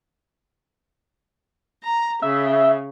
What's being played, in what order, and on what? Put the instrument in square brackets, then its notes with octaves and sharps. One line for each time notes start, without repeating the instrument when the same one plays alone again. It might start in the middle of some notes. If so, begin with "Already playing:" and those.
[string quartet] A#5
[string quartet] C#3 [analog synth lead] E5